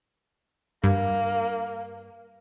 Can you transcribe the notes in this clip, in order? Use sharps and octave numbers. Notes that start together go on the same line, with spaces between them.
G2 A#3